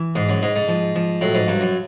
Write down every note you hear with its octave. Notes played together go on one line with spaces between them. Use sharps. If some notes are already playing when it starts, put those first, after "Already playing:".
Already playing: E3
G#2 G#3
F#2
G#2 G#3
G#2
F3
F3
A2 F#3
G#2
G2 F#3
F#2